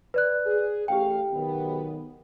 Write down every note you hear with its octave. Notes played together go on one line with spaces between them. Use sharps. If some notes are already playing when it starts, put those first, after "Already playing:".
B4 D5 F#6
G#4
A1 G4 F5 G5
B1 D#3 B3